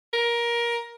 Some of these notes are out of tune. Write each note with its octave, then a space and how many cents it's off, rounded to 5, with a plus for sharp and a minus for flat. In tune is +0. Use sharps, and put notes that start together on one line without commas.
A#4 +20